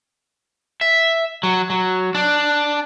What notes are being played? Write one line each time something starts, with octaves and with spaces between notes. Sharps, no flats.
E5
F#3
F#3
D4